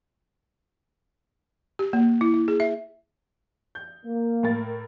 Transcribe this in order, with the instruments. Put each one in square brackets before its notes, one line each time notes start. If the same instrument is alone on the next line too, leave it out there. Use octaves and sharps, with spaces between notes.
[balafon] G4
A#3
E4
E4
G#4
E5
[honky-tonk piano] G6
[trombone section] A#3
[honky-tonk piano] A2 A#4 A6